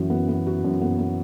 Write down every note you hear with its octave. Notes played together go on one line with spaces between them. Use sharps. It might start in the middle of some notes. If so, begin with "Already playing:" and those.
Already playing: F#2 E3 F#4
B3
B3
F#4
F#2
B3
B3